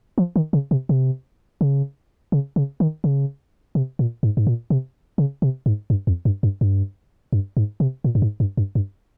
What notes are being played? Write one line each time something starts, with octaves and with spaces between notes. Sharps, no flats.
F3
D#3
C#3
C3
C3
C#3
C#3
C#3
D#3
C#3
C3
A#2
G#2
G#2
A#2
C3
C#3
C3
G#2
G2
F2
G2
G2
G2
G2
G#2
C3
A#2
G2
G#2
G2
G2
G2